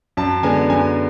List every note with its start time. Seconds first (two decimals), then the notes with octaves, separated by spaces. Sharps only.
0.17 F#2 A5
0.43 D3 G#3 B3 G#5
0.69 F#2 G#5